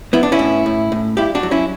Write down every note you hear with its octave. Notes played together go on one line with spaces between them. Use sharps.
B3 E4
D4
C#4 E4
A2
A2
A2
G2 E4 G4
D4 F#4
F#3
C#4 E4